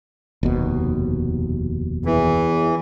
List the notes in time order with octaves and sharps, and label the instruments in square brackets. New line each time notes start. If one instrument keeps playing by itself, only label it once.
[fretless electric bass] F1 D#2 B2
[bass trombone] E2 [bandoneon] E3